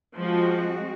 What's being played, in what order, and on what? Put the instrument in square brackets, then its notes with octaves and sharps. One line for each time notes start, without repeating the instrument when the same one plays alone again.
[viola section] F3 [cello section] G#3 C4 F#4